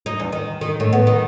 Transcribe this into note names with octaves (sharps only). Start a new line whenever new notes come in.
D#4
E2
D#3
D#3
A2
B3
D#3